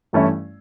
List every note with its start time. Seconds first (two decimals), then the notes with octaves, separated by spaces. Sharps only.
0.13 G2 E3 A3 C#4 E4